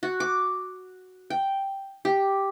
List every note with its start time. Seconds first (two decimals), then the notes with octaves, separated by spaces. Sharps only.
0.03 F#4
0.20 D6
1.30 G5
2.05 G4